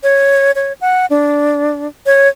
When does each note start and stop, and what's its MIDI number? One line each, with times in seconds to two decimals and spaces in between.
0.03 0.52 73
0.55 0.73 73
0.81 1.06 78
1.10 1.88 62
2.06 2.28 73